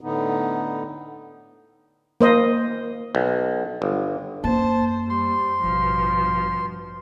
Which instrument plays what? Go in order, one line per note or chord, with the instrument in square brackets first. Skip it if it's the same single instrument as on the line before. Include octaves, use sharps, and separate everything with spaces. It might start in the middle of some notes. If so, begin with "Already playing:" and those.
[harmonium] A2 D3 B3 D#4
[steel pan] A#3 C5 D#5
[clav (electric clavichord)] B1
G1
[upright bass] F#2 A#3 [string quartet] C5 [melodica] A5
[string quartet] G3 [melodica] C6
[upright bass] A1 [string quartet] G2 B2 F3